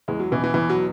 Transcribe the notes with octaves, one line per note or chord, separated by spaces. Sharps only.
E2 G#3
F#3
B2 E3
E3
E2 E3
F#3